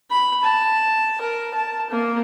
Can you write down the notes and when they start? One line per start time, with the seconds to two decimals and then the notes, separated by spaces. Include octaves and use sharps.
0.11 B5
0.43 A5
1.21 A#4
1.54 A5
1.90 A#3